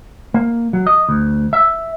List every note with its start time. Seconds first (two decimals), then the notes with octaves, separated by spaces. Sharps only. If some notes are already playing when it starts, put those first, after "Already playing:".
0.34 A#3
0.73 F#3
0.87 D#5
1.09 D2
1.53 E5